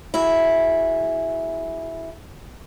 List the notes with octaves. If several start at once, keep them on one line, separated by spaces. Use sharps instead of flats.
E4 F#4 G#4